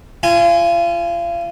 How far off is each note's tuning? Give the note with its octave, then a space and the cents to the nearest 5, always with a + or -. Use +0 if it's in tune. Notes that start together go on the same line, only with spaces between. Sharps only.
F4 -35 G#5 +0